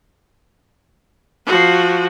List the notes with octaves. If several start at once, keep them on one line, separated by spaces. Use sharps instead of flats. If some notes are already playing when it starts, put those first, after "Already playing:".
F3 F#4